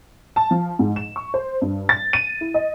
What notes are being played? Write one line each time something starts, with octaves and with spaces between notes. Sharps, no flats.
A5
F3
G#2
E7
C#6
C5
G2
A6
D#7
E4
D#5